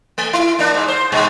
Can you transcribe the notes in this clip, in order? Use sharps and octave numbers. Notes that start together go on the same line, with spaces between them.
A3
E4
A#3 D4
G#2
C5
G#2 B2 G#3